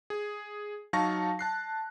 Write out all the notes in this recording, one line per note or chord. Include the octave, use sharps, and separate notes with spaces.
G#4
F#3 D#4 F5 A5 C#6 A#6
A5 F#6 C7